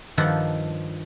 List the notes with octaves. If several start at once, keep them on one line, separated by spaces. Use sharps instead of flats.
G2 D#3 F3 G4 A4 F#5